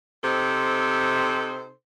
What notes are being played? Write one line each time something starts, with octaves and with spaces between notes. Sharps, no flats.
C3 C4 D#4 A4 C5